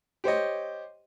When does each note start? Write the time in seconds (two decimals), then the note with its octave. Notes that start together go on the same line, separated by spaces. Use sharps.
0.24 G4 C5 C#5 D#5